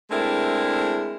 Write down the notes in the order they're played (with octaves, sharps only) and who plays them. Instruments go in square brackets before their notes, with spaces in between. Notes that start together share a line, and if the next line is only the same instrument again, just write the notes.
[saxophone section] G#3 A3 C4 D4 E4 A#4